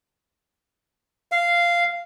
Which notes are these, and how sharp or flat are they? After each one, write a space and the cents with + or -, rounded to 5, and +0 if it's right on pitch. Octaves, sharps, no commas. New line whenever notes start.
F5 -10